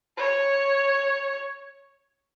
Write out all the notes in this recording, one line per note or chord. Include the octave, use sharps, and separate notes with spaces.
C#5